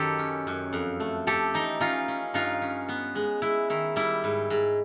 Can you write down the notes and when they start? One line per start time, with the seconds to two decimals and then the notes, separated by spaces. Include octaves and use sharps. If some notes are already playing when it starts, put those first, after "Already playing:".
Already playing: F#2 D#3 G4 A4
0.19 C#4
0.47 F#2
0.73 F2
1.00 A3
1.27 A3 G4 A4
1.54 E3 D#4
1.81 C#4 D#4 F4
2.08 C#4
2.34 G2 D#4 F4
2.62 C#4
2.89 B3
3.15 G#3
3.42 G#3 E4
3.70 D#3 E4
3.96 G3 E4
4.24 G#2
4.50 G#2